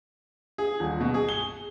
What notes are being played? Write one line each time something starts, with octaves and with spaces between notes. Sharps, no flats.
G#4
D#1
B2
G#4
G7